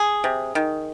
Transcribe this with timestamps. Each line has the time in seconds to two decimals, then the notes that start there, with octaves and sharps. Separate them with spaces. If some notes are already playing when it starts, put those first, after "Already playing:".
Already playing: G#4
0.24 C3
0.55 D#3